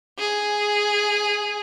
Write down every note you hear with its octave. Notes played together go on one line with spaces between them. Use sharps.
G#4